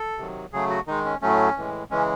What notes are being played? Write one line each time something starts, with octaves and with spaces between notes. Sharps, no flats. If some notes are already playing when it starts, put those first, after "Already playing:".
Already playing: A4
C3 D#3 F#3
C#3 F#3 A3 G#4
F#4
D#3 G#3 D#4
C#4
A2 F#3 A3 C#4
A2 E3 G#3
C#3 E3 G#3 C#4